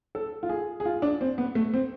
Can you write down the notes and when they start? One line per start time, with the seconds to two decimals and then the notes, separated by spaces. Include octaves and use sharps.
0.15 A4
0.43 F4
0.49 G#4
0.80 G#4
0.86 F4
1.02 D4
1.21 C4
1.38 B3
1.55 A3
1.74 C4